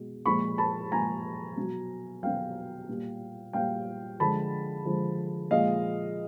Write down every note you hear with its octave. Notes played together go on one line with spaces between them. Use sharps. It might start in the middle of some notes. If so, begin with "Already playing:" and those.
Already playing: B2 G#3
A#2 F3 G#3 B5 C#6
A5 B5
A#2 F3 G#3 G#5 A#5
B2 F#3
B2 F#3 F5 G5
A#2 G3
A#2 G3 F5 G5
D3 F3 G#3 A5 B5
D3 F3 G#3
A#2 F3 G#3 D#5 F5